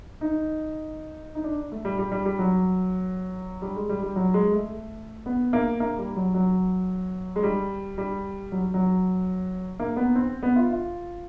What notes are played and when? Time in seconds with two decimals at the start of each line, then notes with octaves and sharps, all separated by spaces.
0.21 D#4
1.35 D#4
1.44 D4
1.72 A3
1.85 G3
1.99 G3
2.12 G3
2.26 G3
2.39 F#3
3.62 G3
3.76 G#3
3.89 G3
4.03 G3
4.16 F#3
4.34 G#3
4.52 A3
5.26 B3
5.53 A#3
5.80 A#3
5.98 G3
6.16 F#3
6.34 F#3
7.36 G#3
7.43 G3
7.98 G3
8.52 F#3
8.74 F#3
9.80 A#3
9.96 B3
10.15 C4
10.43 B3
10.56 F4
10.70 F4